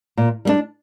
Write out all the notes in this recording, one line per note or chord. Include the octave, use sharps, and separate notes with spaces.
A#2
G3 B3 D4